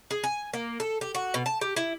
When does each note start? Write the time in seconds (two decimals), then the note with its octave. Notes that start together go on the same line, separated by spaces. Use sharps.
0.11 G#4
0.24 G#5
0.53 A#3
0.80 A4
1.01 G4
1.15 F#4
1.34 B2
1.46 A5
1.61 G4
1.76 E4